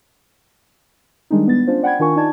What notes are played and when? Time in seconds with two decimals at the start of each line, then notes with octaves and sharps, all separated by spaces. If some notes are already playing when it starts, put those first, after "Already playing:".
1.30 D#3 G3 G#3 D4 D#4
1.47 B3 A6
1.67 C#4 D4 F4 C5
1.83 D5 F#5 G5 B5 G#6
1.99 D#3 D4 F4 A#4 G#5 C#6
2.16 D#4 F4 D5 A5 G#6